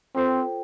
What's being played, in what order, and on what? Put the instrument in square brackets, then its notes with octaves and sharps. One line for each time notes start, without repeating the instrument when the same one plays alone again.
[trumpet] C4 [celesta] F4 A4 C5 G5